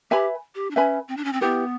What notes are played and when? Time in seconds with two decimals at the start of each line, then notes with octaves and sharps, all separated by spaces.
0.11 G4 B4 E5 G#5 B5
0.55 G4
0.71 D4
0.76 C#4 B4 E5 G#5 B5
1.08 C4
1.17 D4
1.24 C#4
1.33 C4
1.41 B3 E4 G4 B4